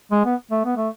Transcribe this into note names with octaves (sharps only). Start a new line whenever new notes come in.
G#3
B3
A3
B3
A3